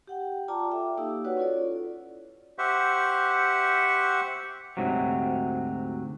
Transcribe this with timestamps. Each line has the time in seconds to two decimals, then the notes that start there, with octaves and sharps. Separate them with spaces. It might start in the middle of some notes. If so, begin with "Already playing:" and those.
0.07 G4 F#5 G5
0.48 F4 D5 G5 A5 A#5 D6
0.71 A4 E5 G5 D6
0.97 A#3 D#4 G4 F5 E6
1.25 F#4 B4 C#5 D5 F#5
1.37 C#4 E4 F4 A4 C#5 D5
2.58 G4 C5 E5 F#5 C#6
4.77 D2 G#2 C3 F#3